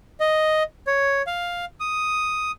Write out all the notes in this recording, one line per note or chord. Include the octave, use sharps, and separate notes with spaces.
D#5
C#5
F5
D#6